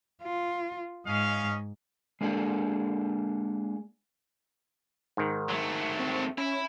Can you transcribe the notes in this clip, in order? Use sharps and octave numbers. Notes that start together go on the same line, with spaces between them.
F4
G#2 C#4 D#5 F5
G#3 A#3 D4 G#4 A4
G#2 D#3
F#3 A3
C4
C#4 E4